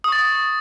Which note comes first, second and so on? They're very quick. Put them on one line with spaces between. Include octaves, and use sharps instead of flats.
D#6 C#6 A6